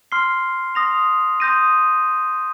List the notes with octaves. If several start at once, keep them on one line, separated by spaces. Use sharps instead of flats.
C6 F6 C7 G7
C6 D#6 A#6 F7
C6 D#6 G6 A#6 D#7